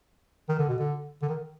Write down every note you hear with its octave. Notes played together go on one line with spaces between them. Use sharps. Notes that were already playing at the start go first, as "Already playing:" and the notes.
D#3
D3
B2
D3
D3
D#3